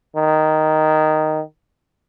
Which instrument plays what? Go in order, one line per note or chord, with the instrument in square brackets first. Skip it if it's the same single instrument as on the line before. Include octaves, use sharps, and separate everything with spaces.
[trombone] D#3